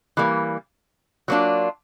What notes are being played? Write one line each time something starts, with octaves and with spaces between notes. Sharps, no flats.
E3 G3 A#3
F#3 A#3 D4 F4